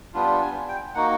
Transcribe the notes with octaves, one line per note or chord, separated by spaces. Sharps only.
G3 B3 D4 F4
G#5
G5
A#3 D#4 F#4 F#5